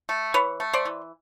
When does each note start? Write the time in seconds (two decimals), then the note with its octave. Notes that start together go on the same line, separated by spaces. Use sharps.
0.09 A3
0.34 E3 B4 C#5
0.60 A3
0.73 C5 D5
0.85 E3